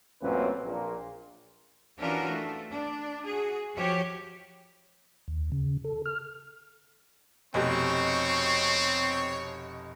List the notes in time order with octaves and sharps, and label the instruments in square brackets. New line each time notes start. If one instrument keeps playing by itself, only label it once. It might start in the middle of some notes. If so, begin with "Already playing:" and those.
[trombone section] A1 F#2 A#2 C4 C#4 B4
A#1 A#2
[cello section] E3 C#4 D4 F4 F#4 A#4
A3
D4
F#4 G#4
F3 F#4 G4 C#5
[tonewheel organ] D#2
C#3
A4
F6
[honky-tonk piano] F1 B2 G4 [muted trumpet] C4 [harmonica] C#5 C#6